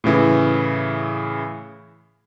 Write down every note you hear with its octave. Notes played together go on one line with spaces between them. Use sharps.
A2 C#3 E3 E4